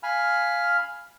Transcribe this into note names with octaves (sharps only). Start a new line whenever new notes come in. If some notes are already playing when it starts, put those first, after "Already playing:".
F5 G#5 B5 F6